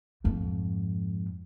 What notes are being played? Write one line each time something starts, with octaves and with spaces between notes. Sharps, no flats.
F2 G#2